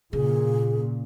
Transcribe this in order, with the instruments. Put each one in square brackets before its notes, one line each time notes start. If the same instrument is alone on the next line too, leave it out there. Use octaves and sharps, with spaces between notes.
[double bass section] A#2 [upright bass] C#3 [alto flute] G#4